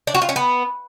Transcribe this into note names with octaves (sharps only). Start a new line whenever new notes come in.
D4
F#4
F4
C#4
B3